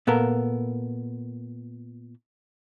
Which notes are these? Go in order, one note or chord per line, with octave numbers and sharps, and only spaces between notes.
A#2 B3 A4 A#4